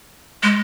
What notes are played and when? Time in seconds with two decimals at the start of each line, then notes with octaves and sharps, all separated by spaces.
0.43 G#3